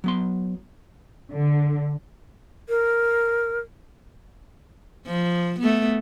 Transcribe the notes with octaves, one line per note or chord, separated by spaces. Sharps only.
F#3 B3 C6
D3
A#4
F3
A3 B3